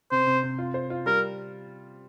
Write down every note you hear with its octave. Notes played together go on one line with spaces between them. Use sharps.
C3 C5
C3
C3
F4
C5
F4
G3 A#4